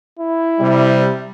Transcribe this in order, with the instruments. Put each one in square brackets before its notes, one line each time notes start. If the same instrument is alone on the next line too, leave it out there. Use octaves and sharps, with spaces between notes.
[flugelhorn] E4
[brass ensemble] C3 G3